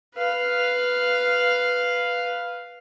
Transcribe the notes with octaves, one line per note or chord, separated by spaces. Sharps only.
B4 F5